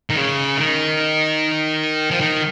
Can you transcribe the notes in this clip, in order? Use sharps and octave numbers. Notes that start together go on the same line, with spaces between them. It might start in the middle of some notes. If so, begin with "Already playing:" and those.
D#3
C#3
D#3
F3
D#3